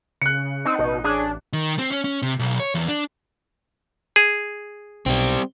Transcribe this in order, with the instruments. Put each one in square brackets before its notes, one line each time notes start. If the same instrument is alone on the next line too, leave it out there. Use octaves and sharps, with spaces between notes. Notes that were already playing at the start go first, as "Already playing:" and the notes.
[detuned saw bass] C#3 [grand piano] F#6 C#7
[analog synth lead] C4 [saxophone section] D4 D#4
[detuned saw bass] A1 [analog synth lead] B2
[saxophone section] C#4 G#4 [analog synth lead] D4
[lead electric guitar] D#3
C4
C#4
C#4
C3
B1
C#5
E2
D4
[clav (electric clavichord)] G#4
[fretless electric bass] B1 B2 [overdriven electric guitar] G3 C4